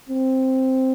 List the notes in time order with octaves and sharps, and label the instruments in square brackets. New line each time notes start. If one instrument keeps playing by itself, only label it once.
[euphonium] C4